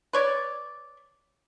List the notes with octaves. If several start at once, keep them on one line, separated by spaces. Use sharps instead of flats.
B4 C#5 D5